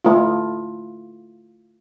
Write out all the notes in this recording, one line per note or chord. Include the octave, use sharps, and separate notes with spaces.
A3 E4 F4